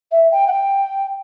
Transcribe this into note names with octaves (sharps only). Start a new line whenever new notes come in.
E5
G5
F#5
G5